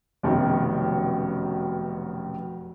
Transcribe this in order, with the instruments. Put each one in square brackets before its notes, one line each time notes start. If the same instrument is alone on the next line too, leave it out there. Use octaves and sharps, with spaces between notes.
[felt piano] F1 F#2 B2 D#3